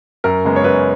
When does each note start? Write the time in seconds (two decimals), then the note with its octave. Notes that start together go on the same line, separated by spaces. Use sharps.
0.24 F#2 A#4
0.45 C#3 G#3 B3
0.56 C#5
0.64 F#2 B4